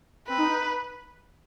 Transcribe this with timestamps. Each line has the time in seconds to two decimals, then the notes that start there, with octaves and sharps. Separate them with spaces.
0.28 C4 B4
0.39 D#4
0.49 D#4